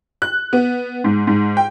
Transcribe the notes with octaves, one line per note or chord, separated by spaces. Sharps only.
F#6
B3
G#2
G#2
G5